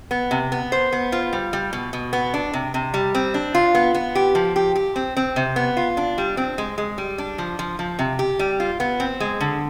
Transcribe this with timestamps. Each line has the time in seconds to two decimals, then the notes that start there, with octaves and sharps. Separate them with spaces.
0.11 B3
0.31 C3
0.52 B3
0.72 C5
0.92 B3
1.12 F4
1.33 G3
1.53 G3
1.73 B2
1.93 B2
2.13 B3
2.34 D4
2.53 C3
2.74 C3
2.94 G3
3.15 C4
3.34 D4
3.55 F4
3.75 B3
3.95 B3
4.15 G4
4.35 F3
4.56 G4
4.76 G4
4.96 C4
5.17 C4
5.36 C3
5.56 B3
5.77 F4
5.97 D4
6.18 G3
6.37 C4
6.58 G#3
6.78 G#3
6.98 G3
7.18 D4
7.38 F3
7.59 F3
7.79 F3
7.99 C3
8.19 G4
8.39 G3
8.60 F4
8.80 B3
9.00 C4
9.20 G#3
9.41 D3